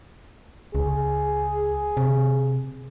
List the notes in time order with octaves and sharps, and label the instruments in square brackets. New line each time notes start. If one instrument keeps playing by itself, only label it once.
[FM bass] C#2 [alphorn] G#4
[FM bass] C3